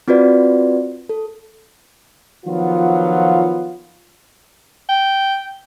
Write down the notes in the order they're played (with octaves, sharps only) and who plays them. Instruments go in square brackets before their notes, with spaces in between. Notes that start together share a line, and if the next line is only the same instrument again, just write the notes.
[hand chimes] C4 F4 F#4 B4 D5
A4
[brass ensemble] D#3 F3 F#3 B3 F4
[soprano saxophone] G5